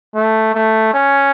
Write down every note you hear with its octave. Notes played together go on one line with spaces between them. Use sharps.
A3
A3
C#4